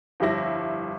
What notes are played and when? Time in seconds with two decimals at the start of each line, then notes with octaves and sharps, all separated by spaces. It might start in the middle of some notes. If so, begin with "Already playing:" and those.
0.20 G1 F2 G3 E4 A#6